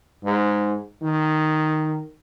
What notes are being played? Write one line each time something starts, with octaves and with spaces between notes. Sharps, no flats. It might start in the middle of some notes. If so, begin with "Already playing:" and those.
G#2
D#3